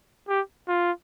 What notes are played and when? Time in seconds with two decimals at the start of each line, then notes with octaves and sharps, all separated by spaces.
0.29 G4
0.68 F4